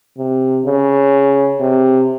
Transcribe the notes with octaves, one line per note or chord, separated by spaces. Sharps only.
C3
C#3
C3